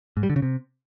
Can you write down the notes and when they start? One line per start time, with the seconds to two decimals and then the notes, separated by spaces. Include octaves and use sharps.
0.17 G#2
0.23 G3
0.30 D3
0.36 C#3
0.42 C3